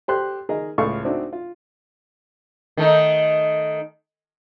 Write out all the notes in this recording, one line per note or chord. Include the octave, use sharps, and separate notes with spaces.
G4 A4 C5 C6 F#6
D#3 G#4 A#4 D#5
C#2 A2 A4 F5 C#6
A3 C4 D4 D#4 F#4
F4
D#3 A3 D#4